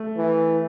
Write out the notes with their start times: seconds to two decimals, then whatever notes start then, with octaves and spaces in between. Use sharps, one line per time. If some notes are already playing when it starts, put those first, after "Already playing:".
Already playing: A3
0.17 E3